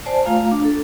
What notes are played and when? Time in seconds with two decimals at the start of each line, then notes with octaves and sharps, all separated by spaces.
0.05 C5 D5 G#5 A5
0.25 A3 F4 F5 A#5
0.51 D4
0.65 A4